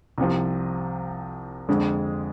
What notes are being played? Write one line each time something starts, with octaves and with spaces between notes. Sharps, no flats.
C2 C3 F3
F2 D3 G#3